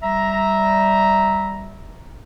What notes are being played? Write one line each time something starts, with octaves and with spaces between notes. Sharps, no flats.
G3 E5 A#5